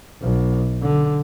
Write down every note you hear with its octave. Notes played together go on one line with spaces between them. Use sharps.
B1
D3